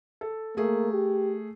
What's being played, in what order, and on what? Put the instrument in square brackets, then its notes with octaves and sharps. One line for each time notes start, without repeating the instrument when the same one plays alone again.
[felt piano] A4
[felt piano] A3 G#4 [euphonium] A#3
[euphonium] G4